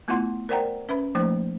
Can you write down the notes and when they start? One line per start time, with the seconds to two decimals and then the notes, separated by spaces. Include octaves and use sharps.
0.08 A3 B3 E4 F4 F#5 C6
0.49 A#4 C5 D5 F#5 G5 A#5
0.89 C#4 B4 E5 B5
1.15 F3 A3 A#3 D#4 C5